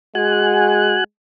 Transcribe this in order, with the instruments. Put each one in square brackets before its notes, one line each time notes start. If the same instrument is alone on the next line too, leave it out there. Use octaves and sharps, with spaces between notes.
[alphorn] G#3 [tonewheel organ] F#4 G#5 F#6